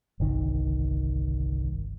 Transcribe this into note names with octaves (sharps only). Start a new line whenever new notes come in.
G1 C2 D#3